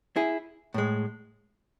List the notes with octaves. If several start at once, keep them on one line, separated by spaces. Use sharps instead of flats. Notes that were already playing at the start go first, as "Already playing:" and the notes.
E4 G#4
A2 G#3